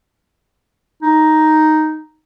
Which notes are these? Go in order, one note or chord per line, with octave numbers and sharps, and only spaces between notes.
D#4